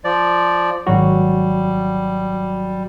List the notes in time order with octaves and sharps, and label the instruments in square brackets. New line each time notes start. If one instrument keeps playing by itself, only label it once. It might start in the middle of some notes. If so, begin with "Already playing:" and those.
[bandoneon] F3 D5
[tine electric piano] G#1 F#3 F#4 [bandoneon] G3